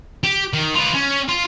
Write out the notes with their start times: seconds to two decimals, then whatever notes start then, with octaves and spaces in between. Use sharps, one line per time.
0.24 G4
0.54 D#3
0.75 F4 B4
0.95 C#4
1.28 F4